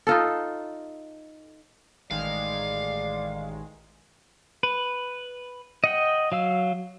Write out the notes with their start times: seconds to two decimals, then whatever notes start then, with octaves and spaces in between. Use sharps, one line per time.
0.07 D#4 F4 A4
2.11 A1 D#3 G#3 D5 F5
4.63 B4
5.84 D#5 F#5 G5
6.32 F#3 F5 E6